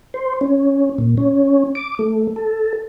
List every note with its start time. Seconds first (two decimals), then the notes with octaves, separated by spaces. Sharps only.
0.14 C5
0.41 C#4
0.98 A#2
1.17 C#4
1.75 D6
1.99 A3
2.36 A4